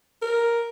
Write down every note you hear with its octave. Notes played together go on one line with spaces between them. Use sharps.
A#4